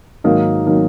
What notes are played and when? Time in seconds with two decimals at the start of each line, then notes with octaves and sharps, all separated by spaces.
0.24 G#2 D#3 F#3 A#3 D#4
0.67 D#3 F#3 A#3 D#4